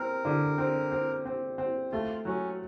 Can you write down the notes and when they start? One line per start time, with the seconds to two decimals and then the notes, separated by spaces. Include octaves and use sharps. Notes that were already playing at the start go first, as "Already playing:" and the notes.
Already playing: C4 A#4
0.25 D3
0.58 C4
0.91 C4
1.25 C4
1.58 C4
1.92 A3 F4
2.25 F#3 C#4